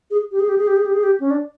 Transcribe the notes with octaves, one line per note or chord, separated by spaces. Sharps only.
G#4
G4
G#4
G4
G#4
G4
G#4
G4
G#4
G4
C#4
D4